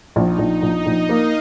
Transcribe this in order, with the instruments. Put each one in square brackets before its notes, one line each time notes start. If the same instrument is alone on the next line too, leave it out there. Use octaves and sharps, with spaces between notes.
[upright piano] A#1 [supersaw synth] D#4
[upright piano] A#1
[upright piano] A#1 [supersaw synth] D#5
[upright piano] A#1
[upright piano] A#3 [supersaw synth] F5